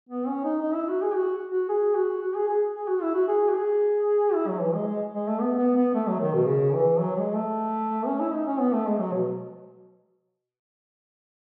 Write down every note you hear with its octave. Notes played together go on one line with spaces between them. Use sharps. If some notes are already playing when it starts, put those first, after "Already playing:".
B3
C#4
D#4
D#4
E4
F#4
G#4
F#4
F#4
G#4
F#4
F#4
G#4
G#4
G#4
F#4
E4
F#4
G#4
F#4
G#4
E4
F#3
E3
G#3
G#3
G#3
A3
B3
B3
B3
A3
F#3
D#3
B2
C#3
E3
F#3
G#3
A3
C#4
E4
D#4
C#4
B3
A3
G#3
F#3
B2